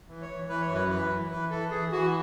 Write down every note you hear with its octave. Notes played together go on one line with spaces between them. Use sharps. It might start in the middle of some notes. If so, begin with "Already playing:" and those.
E3
C#5
E3
E3 B4
C#5
F#2
B4
E3 B4
E3
E3 B4
E3 A4
E3 G#4
E3 F#4